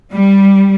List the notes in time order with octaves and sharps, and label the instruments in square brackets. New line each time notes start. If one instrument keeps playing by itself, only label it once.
[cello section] G3